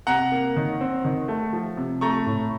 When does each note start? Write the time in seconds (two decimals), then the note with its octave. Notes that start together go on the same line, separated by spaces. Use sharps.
0.07 C3 F#5 A#5
0.32 A#3
0.57 D#3
0.81 C4
1.05 D#3
1.28 A3
1.53 F3
1.77 C3
2.01 A3 A#5 C#6
2.26 A2